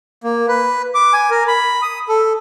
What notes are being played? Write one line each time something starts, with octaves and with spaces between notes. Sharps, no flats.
A#3
B4
D6
G#5
A#4
B5
D#6
A4